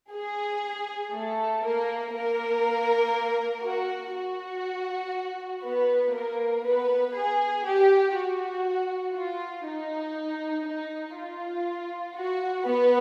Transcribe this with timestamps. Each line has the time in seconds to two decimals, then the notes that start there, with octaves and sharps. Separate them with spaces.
0.13 G#4
1.13 A3 A4
1.63 A#3 A#4
2.14 A#3 A#4
3.64 F#4
4.14 F#4
5.64 B3 B4
6.15 A#3 A#4
6.65 B3 B4
7.15 G#4
7.66 G4
8.15 F#4
9.16 F4
9.66 D#4
10.67 D#4
11.17 F4
12.17 F#4
12.67 B3 B4